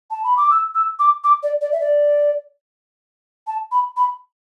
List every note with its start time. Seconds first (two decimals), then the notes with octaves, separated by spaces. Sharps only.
0.11 A5
0.24 B5
0.37 D6
0.51 E6
0.75 E6
0.99 D6
1.24 D6
1.43 D5
1.61 D5
1.72 E5
1.80 D5
3.47 A5
3.72 B5
3.97 B5